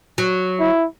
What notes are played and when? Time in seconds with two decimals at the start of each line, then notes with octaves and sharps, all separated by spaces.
0.18 F#3
0.60 E4